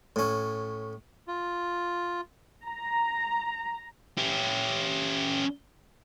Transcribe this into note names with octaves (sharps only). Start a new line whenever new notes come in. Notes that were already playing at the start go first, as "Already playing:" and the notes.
A2 C#4
F4
A#5
C#4 G4